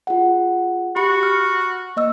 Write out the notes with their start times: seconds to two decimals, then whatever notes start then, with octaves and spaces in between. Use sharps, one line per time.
0.07 F4 G#4 F#5
0.96 F#4 G4 B5 C#7
1.23 F6
1.96 A#3 D#5 E6